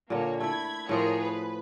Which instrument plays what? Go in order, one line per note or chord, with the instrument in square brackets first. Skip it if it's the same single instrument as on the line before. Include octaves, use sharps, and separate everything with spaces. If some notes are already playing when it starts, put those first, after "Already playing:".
[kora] A#2 D3 [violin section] A#3 C#5
[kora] A3 E4 [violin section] B5 G#6
[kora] A2 F3 C5 [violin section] G#4 A#4 C#5
[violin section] B4